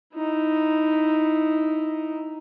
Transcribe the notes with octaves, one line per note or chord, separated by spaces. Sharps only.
D#4 E4